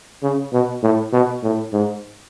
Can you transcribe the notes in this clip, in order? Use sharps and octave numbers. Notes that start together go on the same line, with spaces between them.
C#3
B2
A2
B2
A2
G#2